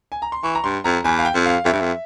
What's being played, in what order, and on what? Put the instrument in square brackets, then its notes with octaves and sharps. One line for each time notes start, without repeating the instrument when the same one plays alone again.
[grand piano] G#5
A#5
C6
[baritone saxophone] E3 [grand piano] C#6
[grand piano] A#5
[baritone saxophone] G2 [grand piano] C6
[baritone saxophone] F2 [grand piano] A#5
[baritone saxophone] E2 [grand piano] G#5
[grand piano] F5
G5
[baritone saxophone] F2
[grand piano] F5
[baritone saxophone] F2 [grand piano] E5
[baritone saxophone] G2
F2